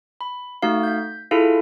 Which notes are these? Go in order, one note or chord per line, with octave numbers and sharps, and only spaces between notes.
B5
A3 D#4 F#4 F5
G6 B6
E4 F4 G#4 A4 F5